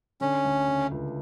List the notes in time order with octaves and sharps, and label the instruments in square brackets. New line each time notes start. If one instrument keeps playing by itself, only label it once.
[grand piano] D3 [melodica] C#4
[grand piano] D2
C#3
C#2